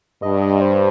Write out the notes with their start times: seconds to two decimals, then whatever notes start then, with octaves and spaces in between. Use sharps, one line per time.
0.22 G2 D#5
0.42 D#5
0.61 C5